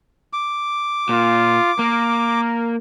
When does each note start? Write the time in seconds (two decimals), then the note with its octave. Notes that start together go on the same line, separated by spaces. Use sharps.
0.33 D6
1.09 A#2 F4
1.79 A#3 A#4